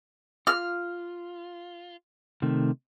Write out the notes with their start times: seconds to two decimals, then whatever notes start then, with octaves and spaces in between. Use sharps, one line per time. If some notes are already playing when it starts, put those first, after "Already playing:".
0.47 F4 F6
2.42 C3 D#3 A3